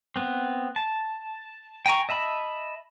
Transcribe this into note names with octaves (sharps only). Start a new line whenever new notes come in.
B3 C4
A5
G5 G#5 A#5 C#6
D#5 E5 A5 B5